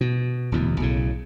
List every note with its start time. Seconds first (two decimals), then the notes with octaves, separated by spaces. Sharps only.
0.01 B2
0.52 D1 E2 B2
0.80 B1 A2 C#3